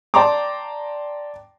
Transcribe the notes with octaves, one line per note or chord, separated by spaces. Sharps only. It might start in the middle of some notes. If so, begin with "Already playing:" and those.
D5 G5 A5 A#5 C6 D6